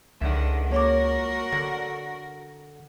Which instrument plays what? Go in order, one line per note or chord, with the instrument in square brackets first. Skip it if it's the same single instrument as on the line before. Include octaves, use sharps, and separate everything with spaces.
[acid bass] C#2 [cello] D3 D#3 [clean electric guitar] E5 F#5
[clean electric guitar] A#3 [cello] F#4 A#4 [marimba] C#5 D6
[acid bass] D3 [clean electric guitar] F#5 [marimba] A#6